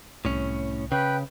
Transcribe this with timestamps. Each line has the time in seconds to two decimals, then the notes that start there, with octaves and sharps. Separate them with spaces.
0.25 C2 A2 C#4
0.92 C#3 B4 G5